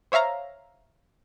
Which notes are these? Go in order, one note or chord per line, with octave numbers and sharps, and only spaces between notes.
C5 C#5 E5 F5 A#5